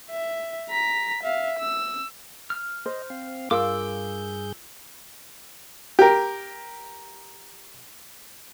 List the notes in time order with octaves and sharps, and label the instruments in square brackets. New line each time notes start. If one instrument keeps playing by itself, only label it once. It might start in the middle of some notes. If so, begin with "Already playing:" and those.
[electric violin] E5
A#5 B6
E5 F5
E6
[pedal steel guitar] F6
[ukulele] C5 [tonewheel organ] D#5
[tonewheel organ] C4 F5
[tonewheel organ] G2 G#4 G6 [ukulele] F4 A#4 F5 [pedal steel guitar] D6 E6
[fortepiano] G4 A#4